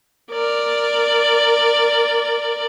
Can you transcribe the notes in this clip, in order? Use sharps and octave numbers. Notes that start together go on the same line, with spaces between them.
A#4 D5